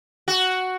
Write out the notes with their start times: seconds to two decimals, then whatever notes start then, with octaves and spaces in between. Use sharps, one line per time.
0.28 F#4